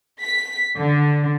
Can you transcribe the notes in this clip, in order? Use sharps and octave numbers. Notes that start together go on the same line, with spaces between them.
B6
D3